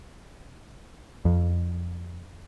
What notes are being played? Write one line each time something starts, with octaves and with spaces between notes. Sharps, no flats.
F2